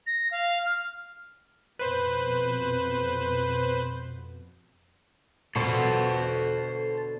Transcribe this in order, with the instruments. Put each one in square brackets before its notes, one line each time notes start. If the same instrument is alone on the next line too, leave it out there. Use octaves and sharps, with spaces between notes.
[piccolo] A#6
F5
F6
[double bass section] F2 B2 [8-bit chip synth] B4 C5
[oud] B2 D3 [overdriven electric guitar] A4 C5